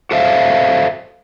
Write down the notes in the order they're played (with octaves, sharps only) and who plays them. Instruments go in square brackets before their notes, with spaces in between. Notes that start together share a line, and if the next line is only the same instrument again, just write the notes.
[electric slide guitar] F#4 A4 C5 E5 F5